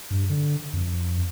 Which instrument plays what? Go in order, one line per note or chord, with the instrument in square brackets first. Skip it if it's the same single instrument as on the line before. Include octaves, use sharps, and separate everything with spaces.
[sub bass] G2
D3
F2